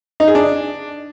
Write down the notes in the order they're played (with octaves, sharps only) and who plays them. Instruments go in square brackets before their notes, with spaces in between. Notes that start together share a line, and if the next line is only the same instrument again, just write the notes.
[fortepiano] D#4
G#4
D4